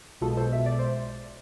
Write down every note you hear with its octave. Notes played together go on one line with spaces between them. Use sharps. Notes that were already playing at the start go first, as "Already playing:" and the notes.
B1 B2 G#3 F4 A4
A4 C5
E5
D5
C5